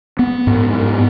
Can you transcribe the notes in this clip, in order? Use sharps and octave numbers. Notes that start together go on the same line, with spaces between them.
B3
G#2
B3